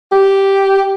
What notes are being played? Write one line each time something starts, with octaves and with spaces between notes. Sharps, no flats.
G4